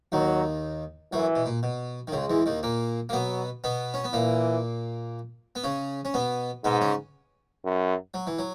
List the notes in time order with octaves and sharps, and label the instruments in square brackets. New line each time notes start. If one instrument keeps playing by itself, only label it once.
[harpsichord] D#2 D#3 [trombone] F#3
[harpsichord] F#2 F#3 [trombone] E3
[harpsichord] B2
A#2
B2
D#3
[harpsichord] C#2 C#3 [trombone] G#3
[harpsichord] E2 E3
D#2 D#3
A#2 A#3
A#3
[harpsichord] B2 B3 [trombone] F#3
[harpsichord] B2 B3
C#4
B3
[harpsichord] A#2 A#3 [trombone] E3
[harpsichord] B3
C#3 C#4
C#4
B2 B3
[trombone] G#2 [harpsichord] B2 B3
[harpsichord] C#3 C#4
[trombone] F#2
[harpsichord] F#3
E3
F#3